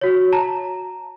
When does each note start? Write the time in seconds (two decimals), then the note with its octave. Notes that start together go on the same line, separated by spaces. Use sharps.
0.01 F#4 C#5
0.32 A5 A#5